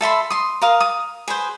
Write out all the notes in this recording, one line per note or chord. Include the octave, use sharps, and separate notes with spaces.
A4 E5 B5 C6
C6 D#6
A#4 F5 D#6
D#6
G#4 B4 C5